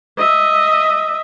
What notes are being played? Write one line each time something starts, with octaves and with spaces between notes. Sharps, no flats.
D#5 E5